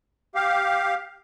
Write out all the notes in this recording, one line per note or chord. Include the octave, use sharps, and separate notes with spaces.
G4 F5